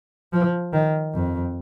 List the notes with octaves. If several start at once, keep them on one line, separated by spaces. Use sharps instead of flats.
F3
D#3
F2